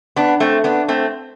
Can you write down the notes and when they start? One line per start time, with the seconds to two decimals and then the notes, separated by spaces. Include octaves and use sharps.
0.16 B3 D4
0.40 A3 C4
0.64 B3 D4
0.88 A3 C4